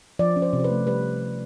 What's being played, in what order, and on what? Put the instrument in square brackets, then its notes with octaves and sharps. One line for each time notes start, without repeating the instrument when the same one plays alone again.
[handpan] F3 D5
C#4
C5
C3
C5
B4
A3
G3 B4